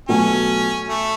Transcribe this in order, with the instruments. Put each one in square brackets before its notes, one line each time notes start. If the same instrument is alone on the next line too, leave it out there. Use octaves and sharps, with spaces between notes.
[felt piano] B2 F#3 A3 [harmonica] C#4
[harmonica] A3